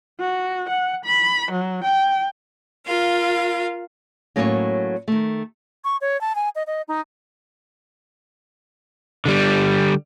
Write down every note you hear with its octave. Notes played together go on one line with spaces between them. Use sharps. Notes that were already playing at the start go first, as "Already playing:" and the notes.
F#4
F#5
B5
F#3
G5
F4 A#4 F5
A2 F#3 A#3 C#4 A4 C#5
D#3 A3
C#6
C#5
A5
G#5
D#5
D#5
D#4
D3 G3